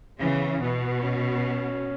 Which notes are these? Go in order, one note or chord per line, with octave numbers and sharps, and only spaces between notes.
C#3 E3 B3
C#4
B2 B3
C#4